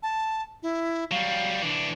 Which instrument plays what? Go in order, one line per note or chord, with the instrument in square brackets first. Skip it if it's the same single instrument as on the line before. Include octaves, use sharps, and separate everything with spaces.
[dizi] A5
E4
[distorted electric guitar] F#3 G3 [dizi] F5
[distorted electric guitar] E3 D4